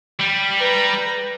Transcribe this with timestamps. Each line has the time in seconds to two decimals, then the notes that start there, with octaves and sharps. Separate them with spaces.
0.19 G3
0.58 B4 A#5